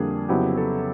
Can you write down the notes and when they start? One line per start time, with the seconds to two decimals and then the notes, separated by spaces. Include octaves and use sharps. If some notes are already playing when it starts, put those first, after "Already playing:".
Already playing: F2 D3 G3 A#3 D4 G#4
0.29 F2 C#3 F#3 B3 E4 G4
0.57 A4